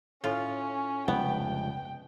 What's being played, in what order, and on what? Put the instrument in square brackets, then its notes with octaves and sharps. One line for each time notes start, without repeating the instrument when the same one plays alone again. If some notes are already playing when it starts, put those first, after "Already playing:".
[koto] A2 F4 [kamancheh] C#4
[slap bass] F1 C#2 G2 [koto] B3 [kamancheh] G5